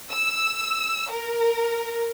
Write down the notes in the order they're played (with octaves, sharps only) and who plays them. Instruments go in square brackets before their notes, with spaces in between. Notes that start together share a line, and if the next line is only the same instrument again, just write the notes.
[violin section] E6
A#4